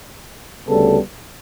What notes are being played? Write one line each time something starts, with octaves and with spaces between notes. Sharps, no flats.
D2 C#3 G3 B3 A4